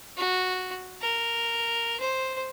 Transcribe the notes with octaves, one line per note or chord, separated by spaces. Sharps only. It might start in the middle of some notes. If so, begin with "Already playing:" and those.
F#4
A#4
C5